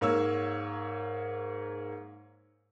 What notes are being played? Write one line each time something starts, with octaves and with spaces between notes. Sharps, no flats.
G#2 A#3 C#5 E6